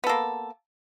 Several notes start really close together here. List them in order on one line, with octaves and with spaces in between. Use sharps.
B3 A4 A#3